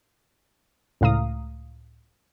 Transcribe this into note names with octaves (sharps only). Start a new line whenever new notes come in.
C#2 A2 F5 A#5 D#6